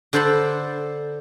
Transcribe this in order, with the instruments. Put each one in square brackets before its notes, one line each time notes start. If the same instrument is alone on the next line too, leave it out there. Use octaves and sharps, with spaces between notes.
[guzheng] D3 A4 C5 A#5 B5